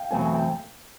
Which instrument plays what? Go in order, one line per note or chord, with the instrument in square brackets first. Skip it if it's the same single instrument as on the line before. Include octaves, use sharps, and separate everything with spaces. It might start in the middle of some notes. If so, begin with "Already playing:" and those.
Already playing: [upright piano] F5 G5
[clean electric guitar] E2 B2 F#3 A3 C4 [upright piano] G#5
[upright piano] G#5
G5